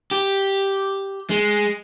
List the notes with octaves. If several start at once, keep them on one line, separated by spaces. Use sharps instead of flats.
G4
G#3